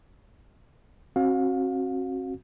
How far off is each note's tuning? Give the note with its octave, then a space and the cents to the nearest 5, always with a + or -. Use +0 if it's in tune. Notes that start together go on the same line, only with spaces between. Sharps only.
C4 +40 F#4 +0 F5 +35